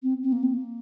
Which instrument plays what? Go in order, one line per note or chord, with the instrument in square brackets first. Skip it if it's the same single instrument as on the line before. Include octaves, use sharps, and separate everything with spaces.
[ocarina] C4
C4
A#3
C4
A#3